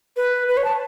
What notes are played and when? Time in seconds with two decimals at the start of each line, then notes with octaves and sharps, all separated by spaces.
0.16 B4
0.48 B4
0.57 C#5
0.64 A5